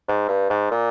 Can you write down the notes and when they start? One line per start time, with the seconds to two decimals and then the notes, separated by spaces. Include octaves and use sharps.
0.09 G#2
0.29 G2
0.50 G#2
0.71 A#2